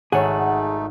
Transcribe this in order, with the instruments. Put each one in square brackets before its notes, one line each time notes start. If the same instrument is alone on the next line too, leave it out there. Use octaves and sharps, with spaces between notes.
[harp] G#1 A4 [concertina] A3 D#4 [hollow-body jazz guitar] G#4 C#5 [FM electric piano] F#5